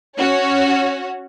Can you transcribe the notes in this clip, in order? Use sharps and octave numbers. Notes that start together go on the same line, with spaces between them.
C#4 F#4 C#5